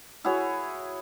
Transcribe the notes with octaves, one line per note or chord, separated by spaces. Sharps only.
E4 F#4 G#4 C#5